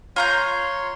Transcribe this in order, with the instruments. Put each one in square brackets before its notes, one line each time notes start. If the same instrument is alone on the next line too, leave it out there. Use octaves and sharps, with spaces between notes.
[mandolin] F4 A#5 G6 [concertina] C#5 C6